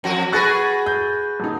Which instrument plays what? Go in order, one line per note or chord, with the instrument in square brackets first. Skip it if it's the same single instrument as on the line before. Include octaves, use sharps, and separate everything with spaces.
[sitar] F2 F#4
[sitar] F#4 G#4 B4 [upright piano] C#6 F#6 A6
[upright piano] G6
D#1 D#4